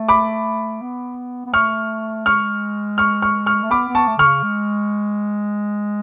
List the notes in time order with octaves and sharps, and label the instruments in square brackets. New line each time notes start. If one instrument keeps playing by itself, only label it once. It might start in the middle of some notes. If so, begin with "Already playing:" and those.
Already playing: [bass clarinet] A3
[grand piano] B5 D6
[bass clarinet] B3
B3
[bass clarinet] A3 [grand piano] C#6 F6
[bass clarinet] G#3 [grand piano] C#6 F6
[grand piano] C#6 F6
C#6 F6
C#6 F6
[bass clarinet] A3
[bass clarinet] B3 [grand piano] B5 D6
[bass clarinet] B3
[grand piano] A5 C#6
[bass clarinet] A3
[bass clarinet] D3 [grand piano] C#6 F6
[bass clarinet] C#3
G#3